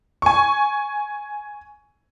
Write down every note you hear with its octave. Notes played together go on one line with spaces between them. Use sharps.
G#5 C#6